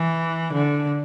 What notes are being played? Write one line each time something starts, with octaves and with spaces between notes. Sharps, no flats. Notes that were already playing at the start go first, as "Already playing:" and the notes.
Already playing: E3
D3